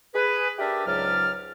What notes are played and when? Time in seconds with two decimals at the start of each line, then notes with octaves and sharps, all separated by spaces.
0.15 G#4 B4
0.59 D4 G4 A#4 D5 E5
0.87 C#2 G#2 F#3 D5 F6